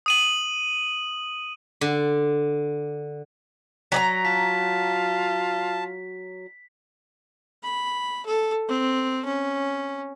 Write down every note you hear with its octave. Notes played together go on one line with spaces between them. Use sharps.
D#6 D#7 F#7
D3
F#3 D5 A#5 B6
F4 A5 B6
B5
A4
C4
C#4